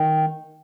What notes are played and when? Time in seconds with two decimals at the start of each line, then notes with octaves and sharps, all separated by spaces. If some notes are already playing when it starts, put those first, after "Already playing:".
Already playing: D#3